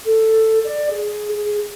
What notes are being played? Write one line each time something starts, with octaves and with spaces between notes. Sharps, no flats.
A4
D5
G#4
G#4